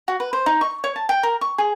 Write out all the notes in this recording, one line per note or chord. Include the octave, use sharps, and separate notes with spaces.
F#4
B4
C5
D#4
C#6
C#5
A5
G5
A#4
C#6
G#4